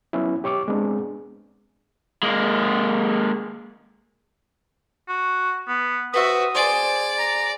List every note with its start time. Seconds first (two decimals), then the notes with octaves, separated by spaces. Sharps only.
0.13 F#3 B3 C#4 E4
0.44 G4 C#5 C#6 D6
0.68 G#3 B3 C4 D4 G#4
2.23 G#3 A#3
5.09 F#4
5.68 B3
6.14 F#4 B4 C5 E5 D#6
6.55 G#4 C5 D5
7.19 A#5